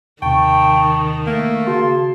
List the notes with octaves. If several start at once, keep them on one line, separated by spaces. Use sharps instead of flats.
D#2 C3 D#3 G5 A5 C#6
A3 A#3
C#3 F#4 A5 C6